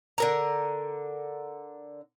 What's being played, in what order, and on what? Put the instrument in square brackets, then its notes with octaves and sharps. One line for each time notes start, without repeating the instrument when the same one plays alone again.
[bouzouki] D3 A#4 A#5